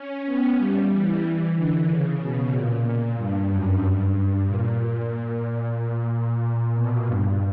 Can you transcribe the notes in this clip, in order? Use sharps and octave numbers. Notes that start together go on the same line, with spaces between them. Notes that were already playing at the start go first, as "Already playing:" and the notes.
Already playing: C#4
B3
G3
E3
E3
D3
C#3
B2
A#2
G2
F#2
G2
A#2
A#2
B2
G2